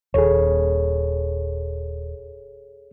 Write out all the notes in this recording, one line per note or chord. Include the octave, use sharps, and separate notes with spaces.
D#1 G#4 A4 C#5